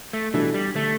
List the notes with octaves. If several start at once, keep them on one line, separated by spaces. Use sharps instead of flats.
A3
B2 E3 G3 D4 A4
G3
D3 A3